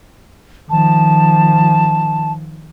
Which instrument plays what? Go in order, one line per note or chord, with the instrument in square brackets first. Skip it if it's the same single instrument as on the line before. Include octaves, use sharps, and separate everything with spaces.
[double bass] D#3 F3 [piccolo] A5